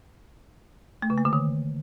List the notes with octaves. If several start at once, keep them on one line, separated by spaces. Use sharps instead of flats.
A3
C#3
A#3
D3
D#3